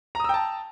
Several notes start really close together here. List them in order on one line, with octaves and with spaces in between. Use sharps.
A#5 D#6 E6 G5 A5